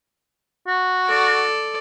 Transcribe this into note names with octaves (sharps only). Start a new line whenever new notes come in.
F#4
A4 D5